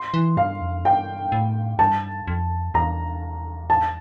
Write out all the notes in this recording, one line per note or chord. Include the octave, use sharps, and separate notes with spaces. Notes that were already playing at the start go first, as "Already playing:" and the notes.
Already playing: C6
E3
G2 F5
F2
G2 G5
A2
G2 A5
F2
E2 A#5
A5